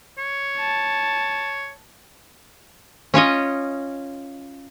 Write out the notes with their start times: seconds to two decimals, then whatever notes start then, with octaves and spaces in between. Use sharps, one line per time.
0.18 C#5
0.59 A5
3.14 C#4 F4 C#5 D#5